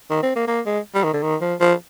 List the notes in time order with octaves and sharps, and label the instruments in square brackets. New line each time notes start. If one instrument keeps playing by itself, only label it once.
[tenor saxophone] D#3
C4
A#3
A#3
G#3
G3
D#3
D3
D#3
F3
F3